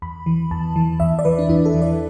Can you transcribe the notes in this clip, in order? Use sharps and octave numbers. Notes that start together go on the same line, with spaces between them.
E2 B5
E3
E2 A5
E3
E2 E5
D5
E3 B4
D4
E2 E4
A4
E3
D5